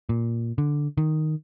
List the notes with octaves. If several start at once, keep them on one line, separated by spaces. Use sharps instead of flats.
A#2
D3
D#3